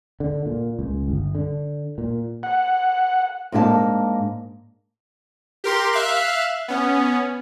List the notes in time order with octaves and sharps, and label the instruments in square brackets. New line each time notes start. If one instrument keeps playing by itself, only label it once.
[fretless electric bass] D3
A#2
C#2
G1
D3
A#2
[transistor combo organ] F#5
[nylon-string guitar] G#2 A#3 D4 A4 F5 A5
[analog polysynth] G4 A#4 C6
E5 F5 F#6
B3 C#4